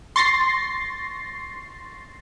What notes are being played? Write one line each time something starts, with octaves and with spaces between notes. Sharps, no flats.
C6 C#6 A6 A#6 C7